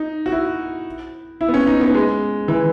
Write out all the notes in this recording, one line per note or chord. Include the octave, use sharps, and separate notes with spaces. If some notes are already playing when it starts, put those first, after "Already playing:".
Already playing: D#4
F#4
E4
E4
B3
C#4
D#4
B3
G#3
E3